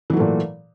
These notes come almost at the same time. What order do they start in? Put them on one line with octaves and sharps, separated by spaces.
E3 F#3 A3 A#2